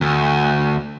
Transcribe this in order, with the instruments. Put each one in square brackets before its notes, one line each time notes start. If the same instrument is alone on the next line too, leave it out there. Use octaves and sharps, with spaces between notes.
[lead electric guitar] D2